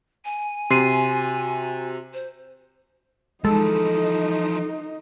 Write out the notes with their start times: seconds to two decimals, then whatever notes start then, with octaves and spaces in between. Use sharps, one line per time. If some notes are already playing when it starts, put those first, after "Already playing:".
0.25 G#5
0.70 C3 F#4 C6 C7 D#7
2.13 C5
3.44 E3 F3 G#3 D#4 A4 D#5